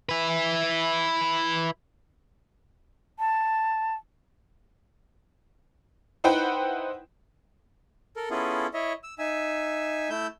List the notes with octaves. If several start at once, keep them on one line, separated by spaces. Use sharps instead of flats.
E4 B4
A5
D#4 E4 B4 C5 F#5 G5
A4 A#4
B3 C#4 E4 F4 G#4 A4
E4 C#5 D#5 E5
E6
D#4 E5 G#5 E6
A3 E4 E6 G6